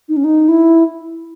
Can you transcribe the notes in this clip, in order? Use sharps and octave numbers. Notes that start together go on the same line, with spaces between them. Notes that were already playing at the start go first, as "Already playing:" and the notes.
D#4
C#4
D#4
E4